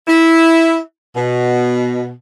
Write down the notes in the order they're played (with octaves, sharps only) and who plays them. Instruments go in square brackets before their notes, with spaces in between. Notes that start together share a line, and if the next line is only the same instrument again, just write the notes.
[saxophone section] E4
B2